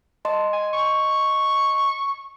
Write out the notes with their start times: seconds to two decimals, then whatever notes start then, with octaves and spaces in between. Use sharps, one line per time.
0.25 D#5 A5 C6
0.53 G#5
0.73 C#6